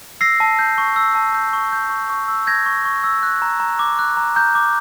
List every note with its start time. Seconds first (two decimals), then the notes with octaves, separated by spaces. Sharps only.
0.21 E6 A#6 C7
0.40 A5
0.59 G6
0.78 C#6
0.96 E6
1.15 A5
1.35 G6
1.53 C#6
1.72 G6
1.90 C#6
2.10 C#6
2.28 E6
2.47 G6 G#6 A#6
2.66 C#6
2.85 C#6
3.04 E6
3.23 F#6
3.42 A#5
3.60 A#5
3.79 D6
3.99 F#6
4.17 A#5
4.36 A#5 G6
4.55 D6